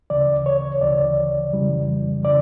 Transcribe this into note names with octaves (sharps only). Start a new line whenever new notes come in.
D2 C#3 E3 D5
C#5
D2 C#3 E3 D5
F2 C#3 E3 G3
C#3 E3 D5